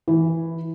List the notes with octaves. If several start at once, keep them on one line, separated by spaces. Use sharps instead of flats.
E3